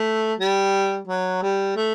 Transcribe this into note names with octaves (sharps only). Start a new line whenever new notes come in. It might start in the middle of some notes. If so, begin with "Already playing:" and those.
Already playing: A3
G3
F#3
G3
A3